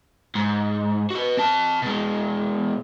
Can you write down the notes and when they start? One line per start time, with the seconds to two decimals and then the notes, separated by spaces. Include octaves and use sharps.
0.35 G#2
1.10 F#4 B4
1.37 C4 A5
1.82 B2 G#3